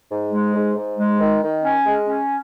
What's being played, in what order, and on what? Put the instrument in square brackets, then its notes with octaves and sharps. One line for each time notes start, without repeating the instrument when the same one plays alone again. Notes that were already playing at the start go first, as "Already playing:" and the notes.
[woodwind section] G#2
G#3
G#2
G#2
G#3
D#3
D#3
C#4
G#3
C#4